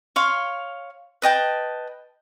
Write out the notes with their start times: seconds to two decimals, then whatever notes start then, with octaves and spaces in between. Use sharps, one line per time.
0.16 C#5 F5 C6
1.22 B4 D#5 G5 A5